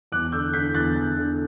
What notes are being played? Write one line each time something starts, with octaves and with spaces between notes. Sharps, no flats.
E2 D6 F#6
D3 E6 G6
D3 G6 B6
E2 F#6 A6
E2
D3